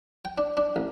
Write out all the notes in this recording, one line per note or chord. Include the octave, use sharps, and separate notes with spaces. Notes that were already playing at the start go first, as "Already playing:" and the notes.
G5
D4
D4
A1